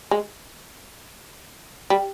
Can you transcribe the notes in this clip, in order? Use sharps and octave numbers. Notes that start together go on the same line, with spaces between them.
G#3
G3